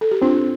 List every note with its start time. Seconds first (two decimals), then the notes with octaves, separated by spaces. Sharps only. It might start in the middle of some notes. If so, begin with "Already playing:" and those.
0.01 A4
0.11 G4
0.22 C4 D4 F4